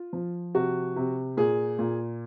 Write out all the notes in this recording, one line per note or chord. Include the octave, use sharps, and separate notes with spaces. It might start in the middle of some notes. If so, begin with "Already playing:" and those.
Already playing: F4
F3
C3 F#4
C3
A#2 G#4
A#2